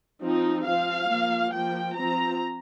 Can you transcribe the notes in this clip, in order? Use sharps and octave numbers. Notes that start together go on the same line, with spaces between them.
F3 C4 D#4
F3 C4 F5
F3 A#3
F3 A#3 G5
F3 C4 A#5